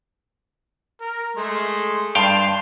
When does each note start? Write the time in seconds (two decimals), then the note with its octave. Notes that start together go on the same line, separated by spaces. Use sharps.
1.01 A#4
1.37 G#3 A3 C6
2.15 G2 F5 G5 A5 C6